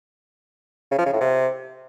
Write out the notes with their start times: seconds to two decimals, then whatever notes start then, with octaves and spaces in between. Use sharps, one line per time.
0.91 C#3
0.98 F3
1.06 C#3
1.13 A2
1.20 C3